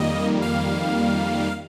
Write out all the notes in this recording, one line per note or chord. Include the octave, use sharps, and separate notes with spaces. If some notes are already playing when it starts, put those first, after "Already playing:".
Already playing: F2 D#3 G3 A#3 D#5
F5